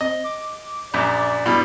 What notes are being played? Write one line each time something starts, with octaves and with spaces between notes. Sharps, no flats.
C4 D#5
D6
A#1 F#2 D5 D6
G2 B2 E4